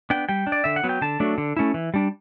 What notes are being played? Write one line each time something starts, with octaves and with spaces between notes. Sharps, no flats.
B3 D4 G5
G3 G5
D4
D5
D3 E5
F#5
F#3 B3
G5
D3 A5
F#3 A3 D4
D3
A3 C#4 E4
E3
G3 D4